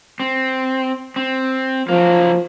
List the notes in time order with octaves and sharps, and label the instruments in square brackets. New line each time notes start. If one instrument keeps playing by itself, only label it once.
[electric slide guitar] C4
C4
[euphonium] F3 [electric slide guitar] F#3 A#3